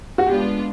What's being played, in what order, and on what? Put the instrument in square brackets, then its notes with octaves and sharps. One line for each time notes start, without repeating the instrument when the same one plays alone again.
[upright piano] F#4
[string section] G#3 B3 D4 F4 [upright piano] G4